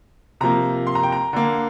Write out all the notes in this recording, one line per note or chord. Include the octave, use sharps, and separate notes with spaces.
C3 F3 A#3 A#5
C6
A#5
G5
A#5
D3 A#3